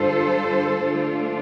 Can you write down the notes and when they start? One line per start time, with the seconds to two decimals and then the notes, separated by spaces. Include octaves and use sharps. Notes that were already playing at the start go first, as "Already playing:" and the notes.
Already playing: G2 D3 G3 D4 F4 A4 C5
0.81 D3 A3 D4 F4